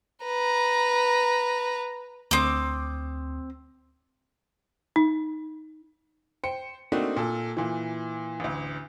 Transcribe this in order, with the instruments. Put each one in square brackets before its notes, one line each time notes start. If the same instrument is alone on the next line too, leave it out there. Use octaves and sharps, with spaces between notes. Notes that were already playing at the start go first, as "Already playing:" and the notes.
[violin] B4 A#5
[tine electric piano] D2 D#6 [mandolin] C4 D6
[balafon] D#4
[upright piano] C5 G5 C#7
A3 A#3 C4 D4 D#4 F#4
A#2 A4
A#2 E3
A1 D2